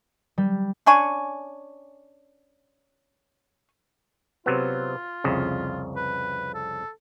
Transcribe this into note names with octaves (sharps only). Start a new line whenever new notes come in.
G3
C#4 D4 G#5 C#6
C3 F#3 B3 F4
C2 F2 C#3
B4
A4